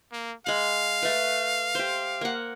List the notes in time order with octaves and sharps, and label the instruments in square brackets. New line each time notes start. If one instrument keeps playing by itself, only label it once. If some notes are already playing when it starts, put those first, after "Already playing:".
[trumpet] A#3
[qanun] G#3 B5 [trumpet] F5
[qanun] A3 B4
G4 C5
A#3 F#5